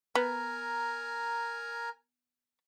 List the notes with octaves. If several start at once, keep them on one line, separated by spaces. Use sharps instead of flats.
B3 A#4 G#5 A#5